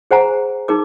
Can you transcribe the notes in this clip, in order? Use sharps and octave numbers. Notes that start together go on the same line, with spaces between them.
G#4 C5 F#5 G#5 A#5
D#4 G#4 A#4 D6